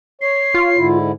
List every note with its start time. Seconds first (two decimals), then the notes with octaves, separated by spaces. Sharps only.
0.21 C#5 C7
0.54 F4
0.77 G#2 D3 E4